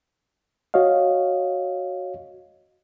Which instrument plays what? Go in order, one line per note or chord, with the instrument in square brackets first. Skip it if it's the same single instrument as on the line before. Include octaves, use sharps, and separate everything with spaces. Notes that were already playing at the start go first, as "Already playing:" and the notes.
[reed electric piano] F#4 C#5 D#5 F5